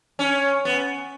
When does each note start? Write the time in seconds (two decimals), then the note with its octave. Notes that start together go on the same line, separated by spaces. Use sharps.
0.19 C#4
0.65 B3